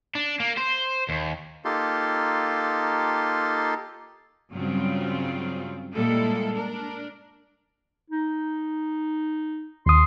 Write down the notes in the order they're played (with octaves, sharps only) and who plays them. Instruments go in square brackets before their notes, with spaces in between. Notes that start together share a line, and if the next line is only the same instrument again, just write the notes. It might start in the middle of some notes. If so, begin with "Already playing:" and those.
[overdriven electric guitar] D4
A#3
C5
D#2
[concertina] A#3 D#4 F4 G4 A4 C6
[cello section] G2 C#3 F#3 G3 C4 F4
A#2 G3 G#3 A#3 E4 A4
D4 A#4
[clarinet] D#4
[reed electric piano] D#2 D#6 [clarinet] C6